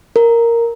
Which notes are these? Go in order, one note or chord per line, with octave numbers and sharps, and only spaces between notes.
A#4